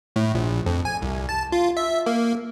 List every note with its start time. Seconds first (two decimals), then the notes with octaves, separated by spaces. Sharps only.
0.16 A2
0.35 A#1
0.66 F2
0.85 G#5
1.02 C2
1.29 A5
1.52 F4
1.77 E5
2.06 A#3